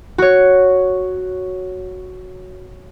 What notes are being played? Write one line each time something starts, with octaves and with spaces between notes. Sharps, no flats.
F#4 C#5